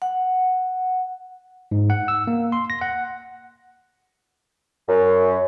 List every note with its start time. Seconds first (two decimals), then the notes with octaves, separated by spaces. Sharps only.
0.02 F#5
1.71 G#2
1.90 F#5
2.08 E6
2.27 A#3
2.52 C6
2.70 A#6
2.81 F#5
4.89 F#2